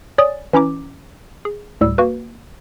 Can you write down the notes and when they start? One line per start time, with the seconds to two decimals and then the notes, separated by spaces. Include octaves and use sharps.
0.18 C#5 D5 G#5 D#6 A6
0.53 E3 C#4 E4 A#5 D6
1.45 G#4
1.81 D2 A2 G3 E6
1.98 A#3 F#4 B4